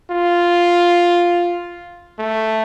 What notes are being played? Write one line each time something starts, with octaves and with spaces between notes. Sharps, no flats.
F4
A3